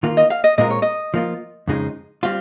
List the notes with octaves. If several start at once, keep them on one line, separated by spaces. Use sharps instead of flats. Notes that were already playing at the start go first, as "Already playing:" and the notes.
D#3 A#3 F4
D#5
F5
D#5
A#2 G#3 C4 F4 A#4 D#5
C#5
D#5
F3 A#3 F4
F2 C#3 F3 G#3 D#4
G3 C4 F4 F5